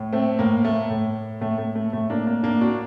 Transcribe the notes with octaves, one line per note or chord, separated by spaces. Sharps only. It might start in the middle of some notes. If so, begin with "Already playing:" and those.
Already playing: A2
A3 C4
A2 A#3
A3
A2
A2 A3
A3
A3
A2 A3
A#3 D4
A#3 D4
A2 A#3 D4
D4 F#4